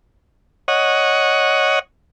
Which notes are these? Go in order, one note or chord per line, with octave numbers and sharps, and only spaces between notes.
C#5 D#5 F#5